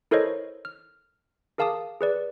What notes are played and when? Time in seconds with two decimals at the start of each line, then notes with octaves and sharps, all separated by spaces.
0.11 E4 A4 A#4 C5 C#5 D#5
0.65 F6
1.58 G#4 A#4 F5 A5 D6 D#6
2.01 G#4 B4 D5